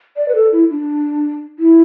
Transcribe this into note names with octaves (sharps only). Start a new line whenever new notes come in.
D5
B4
A4
E4
D4
E4